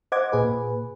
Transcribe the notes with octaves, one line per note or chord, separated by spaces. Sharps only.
C5 D#5 F#5 D6 G#6
A#2 G#4 B4